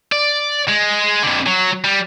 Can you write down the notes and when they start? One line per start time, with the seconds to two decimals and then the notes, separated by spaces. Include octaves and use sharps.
0.12 D5
0.68 G#3
1.23 F2 D3
1.47 F#3
1.84 G3